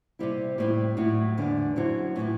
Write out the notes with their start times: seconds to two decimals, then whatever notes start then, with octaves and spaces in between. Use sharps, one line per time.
0.19 C3 G3 C4 E4
0.58 A2 G3 C4 E4
0.97 A2 F#3 A3 E4
1.38 E2 D3 G3 D4
1.76 F#2 F#3 C4 E4
2.16 A2 E3 A3 E4